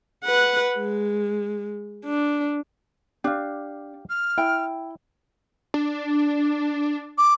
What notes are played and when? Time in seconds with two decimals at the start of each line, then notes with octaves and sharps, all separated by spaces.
0.24 B4 F#5
0.78 G#3
2.05 D4
3.24 D4 G4 F5
4.09 F6
4.38 E4 G5
5.74 D4
7.18 D6